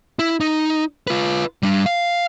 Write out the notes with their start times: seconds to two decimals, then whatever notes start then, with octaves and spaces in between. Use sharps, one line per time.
0.19 E4
0.41 D#4
1.07 F4 B4
1.63 G3 D4
1.86 F5